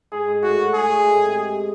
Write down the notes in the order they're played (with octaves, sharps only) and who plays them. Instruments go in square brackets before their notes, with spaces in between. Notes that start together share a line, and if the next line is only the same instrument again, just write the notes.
[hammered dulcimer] G#2 [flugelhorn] G#4
[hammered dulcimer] G#2
[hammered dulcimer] A2 [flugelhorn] F#4
[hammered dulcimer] A2
[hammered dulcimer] G#2 [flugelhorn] G#4
[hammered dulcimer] A2
G#2
C3